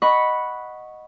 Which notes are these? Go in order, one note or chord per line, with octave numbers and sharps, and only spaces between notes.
D#5 F#5 B5 C#6